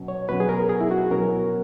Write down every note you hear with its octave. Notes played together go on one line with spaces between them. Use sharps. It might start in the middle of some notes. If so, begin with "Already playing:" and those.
Already playing: B2 F#3 C#4
C#5
B2 F#3 C#4 B4
G#4
A#4
G#4
E4
F#4
B2 F#3 C#4 A#4